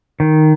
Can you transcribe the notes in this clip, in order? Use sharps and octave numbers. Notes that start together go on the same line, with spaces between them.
D#3